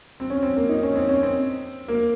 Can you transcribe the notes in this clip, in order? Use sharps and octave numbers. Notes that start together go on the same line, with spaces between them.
C4
C#4
C4
A#3
D#4
C#4
C4
C#4
C4
A#3